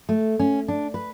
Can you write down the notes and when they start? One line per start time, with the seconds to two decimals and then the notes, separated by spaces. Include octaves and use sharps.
0.09 A3
0.40 C#4
0.68 D4
0.94 B4